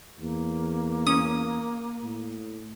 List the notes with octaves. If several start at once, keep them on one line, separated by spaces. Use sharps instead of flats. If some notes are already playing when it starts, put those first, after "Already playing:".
E2 A#3
C#4 D#6
A2